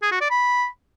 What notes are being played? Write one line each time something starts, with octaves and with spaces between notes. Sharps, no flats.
G#4
F#4
D5
B5